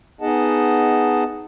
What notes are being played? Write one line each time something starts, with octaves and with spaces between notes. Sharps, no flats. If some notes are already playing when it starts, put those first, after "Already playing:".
B3 D#4 G#4 D#5 F#5 A5